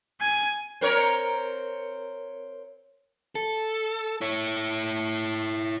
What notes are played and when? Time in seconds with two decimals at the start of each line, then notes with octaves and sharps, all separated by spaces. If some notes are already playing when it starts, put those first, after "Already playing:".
0.20 G#5
0.81 C4 A#4 C#5
3.35 A4
4.21 E4 C#5